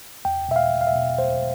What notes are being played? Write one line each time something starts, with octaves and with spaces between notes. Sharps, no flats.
E2 G5
B2 E5
F5
E2
F5
E5
B2
E2 C5